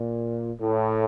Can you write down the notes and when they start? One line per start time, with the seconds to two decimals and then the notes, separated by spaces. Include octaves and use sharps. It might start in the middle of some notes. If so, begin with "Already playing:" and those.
Already playing: A#2
0.60 A2